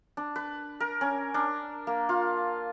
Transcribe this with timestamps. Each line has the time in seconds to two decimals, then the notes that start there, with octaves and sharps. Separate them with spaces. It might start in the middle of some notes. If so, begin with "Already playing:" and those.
0.17 D4
0.36 B4
0.80 A#4
1.01 C#4
1.34 D4
1.87 A#3
2.09 F4